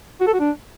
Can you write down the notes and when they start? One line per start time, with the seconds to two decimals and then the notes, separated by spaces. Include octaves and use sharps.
0.21 F#4
0.27 A4
0.34 F#4
0.40 D4